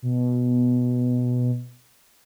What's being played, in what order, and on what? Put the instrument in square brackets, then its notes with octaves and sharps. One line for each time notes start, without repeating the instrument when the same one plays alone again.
[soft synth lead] B2